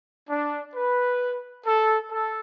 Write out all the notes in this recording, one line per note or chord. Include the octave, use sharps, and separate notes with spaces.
D4
B4
A4
A4